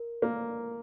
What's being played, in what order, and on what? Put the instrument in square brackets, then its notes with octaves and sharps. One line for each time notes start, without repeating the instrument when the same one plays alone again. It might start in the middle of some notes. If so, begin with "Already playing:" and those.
Already playing: [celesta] A#4
[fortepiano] A#3